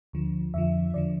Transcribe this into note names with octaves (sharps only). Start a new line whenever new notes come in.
D2 D3 F3
F2 D3 F3 E5
E2 D3 F3 D5